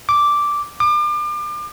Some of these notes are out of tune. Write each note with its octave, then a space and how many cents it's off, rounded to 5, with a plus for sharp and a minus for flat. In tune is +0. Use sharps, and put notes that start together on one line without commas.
D6 -5
D6 +35